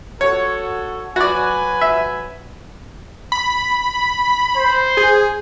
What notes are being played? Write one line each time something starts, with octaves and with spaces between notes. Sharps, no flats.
F#4 A4 C#5
F#3 F#4 B4 D5 G#5
E5
B5
C5
G#4